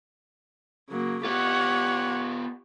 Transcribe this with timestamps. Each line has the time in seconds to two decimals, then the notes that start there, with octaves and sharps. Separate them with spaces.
0.89 C#3 F#3 A#3
1.25 B3 F4 G4 C#5 F#5